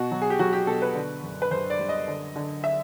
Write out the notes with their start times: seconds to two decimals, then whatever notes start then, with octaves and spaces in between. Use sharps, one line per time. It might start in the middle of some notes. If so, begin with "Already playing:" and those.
Already playing: B2 F#4
0.11 F#3
0.22 G#4
0.30 G4
0.39 F#3 F#4
0.53 G4
0.67 B2 A4
0.82 B4
0.95 D3
1.24 F#2
1.42 B4
1.51 F#2 C5
1.70 D5
1.79 G3
1.89 D#5
2.08 D3
2.36 D3
2.64 E5